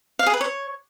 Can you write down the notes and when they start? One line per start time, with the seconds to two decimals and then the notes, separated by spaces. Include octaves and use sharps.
0.19 F5
0.26 G#4
0.34 B4
0.41 C#5